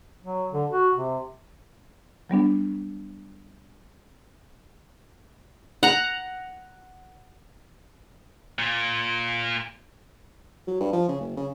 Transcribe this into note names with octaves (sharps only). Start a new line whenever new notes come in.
F#3
D3
F#4
C3
F#3 G3 B3 D4
F#5 A#5
A#2
F#3
G2
F3
C#3
F#1
C#3